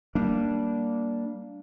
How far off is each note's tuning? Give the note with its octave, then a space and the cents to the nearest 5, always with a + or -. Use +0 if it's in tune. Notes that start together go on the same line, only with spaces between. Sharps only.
G3 -10 A#3 +0 D4 -10